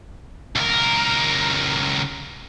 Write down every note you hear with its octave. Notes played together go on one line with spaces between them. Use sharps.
C#2 A#4